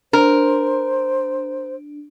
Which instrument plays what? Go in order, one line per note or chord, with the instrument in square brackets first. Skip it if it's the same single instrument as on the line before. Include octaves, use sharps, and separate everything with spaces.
[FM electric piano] D4 [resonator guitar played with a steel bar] A#4 [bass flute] C5